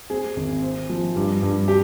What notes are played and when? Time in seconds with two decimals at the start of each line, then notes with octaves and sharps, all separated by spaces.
0.10 C4 G#4
0.36 G#1
0.62 C4
0.89 F3
1.16 G2
1.42 G2
1.68 G4